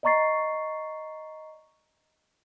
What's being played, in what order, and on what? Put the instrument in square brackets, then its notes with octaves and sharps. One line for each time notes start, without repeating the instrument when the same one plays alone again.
[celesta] D5 D#5 A#5 C#6 A6 C7